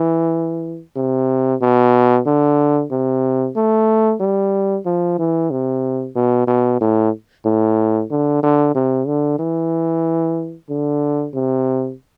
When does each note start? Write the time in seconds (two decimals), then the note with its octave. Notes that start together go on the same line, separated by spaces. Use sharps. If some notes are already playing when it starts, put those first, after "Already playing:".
Already playing: E3
0.97 C3
1.62 B2
2.26 D3
2.91 C3
3.56 A3
4.21 G3
4.86 F3
5.19 E3
5.51 C3
6.16 B2
6.47 B2
6.81 A2
7.45 A2
8.10 D3
8.43 D3
8.75 C3
9.07 D3
9.39 E3
10.69 D3
11.34 C3